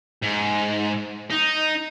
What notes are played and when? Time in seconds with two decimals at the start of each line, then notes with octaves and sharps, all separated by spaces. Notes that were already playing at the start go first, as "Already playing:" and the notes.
0.22 G#2
1.30 D#4